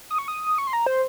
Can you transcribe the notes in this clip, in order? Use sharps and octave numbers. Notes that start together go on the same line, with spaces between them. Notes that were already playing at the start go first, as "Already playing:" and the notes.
D#6
C#6
D#6
C#6
C6
A#5
C5